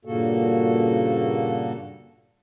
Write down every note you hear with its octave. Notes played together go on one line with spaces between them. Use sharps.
G2 A#2 C#3 A#3 F#4 A4